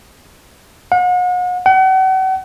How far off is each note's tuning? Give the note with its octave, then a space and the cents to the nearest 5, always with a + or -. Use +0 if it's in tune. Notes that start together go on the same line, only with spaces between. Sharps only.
F#5 -40
F#5 +40